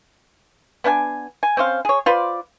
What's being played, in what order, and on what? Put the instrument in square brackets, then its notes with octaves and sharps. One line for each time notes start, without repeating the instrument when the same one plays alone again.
[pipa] B3 D4 F#5 G#5
G#5
C4 C#4 C5 F5
G#4 C#5
F4 B4 C5 D5